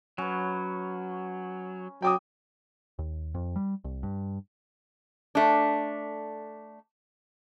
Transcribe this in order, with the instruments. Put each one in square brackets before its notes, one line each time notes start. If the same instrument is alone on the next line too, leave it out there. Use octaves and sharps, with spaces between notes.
[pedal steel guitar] F#3 [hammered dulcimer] C#4 B4
[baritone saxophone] F#3 [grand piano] G5 D6 D#6
[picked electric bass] D#2
F2
G3
C2
G2
[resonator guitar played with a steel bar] A3 D4